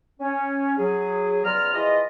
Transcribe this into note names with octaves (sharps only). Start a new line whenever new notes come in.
C#4
F#3 G#4
C#2 B3 F4 D5 A#5 F6
E3 F3 F4 G#4 D#5